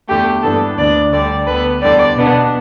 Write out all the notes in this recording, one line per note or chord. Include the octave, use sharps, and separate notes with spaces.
E2 D3 A3 G4
G2 E3 B3 D4 A4
D2 D3 B3 D4 D5
D2 D3 G3 D5
D2 D3 B3 B4
E2 D3 G3 D5
B2 B3 D4